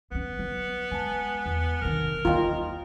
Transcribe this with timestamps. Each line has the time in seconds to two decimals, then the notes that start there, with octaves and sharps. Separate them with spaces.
0.11 E3 B3 C#4
0.39 F#3
0.92 G#3 G#5 A5
1.46 E2
1.82 C3 D#3 A#4
2.25 D#2 A#3 F4 D#5 G5 A#5